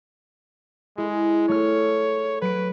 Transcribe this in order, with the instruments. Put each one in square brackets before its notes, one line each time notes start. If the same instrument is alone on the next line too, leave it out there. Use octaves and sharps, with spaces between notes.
[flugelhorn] G#3 [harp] E4 G#4
[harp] A3 F6 [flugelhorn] C#5
[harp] F#3 D7 [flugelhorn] B4